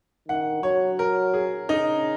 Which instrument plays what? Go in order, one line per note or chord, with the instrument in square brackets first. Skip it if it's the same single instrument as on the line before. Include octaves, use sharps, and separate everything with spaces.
[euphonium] D#3 [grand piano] F#5
[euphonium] F#3 [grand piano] C#5
[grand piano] A#4
G#4
[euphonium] C#3 [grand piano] D#4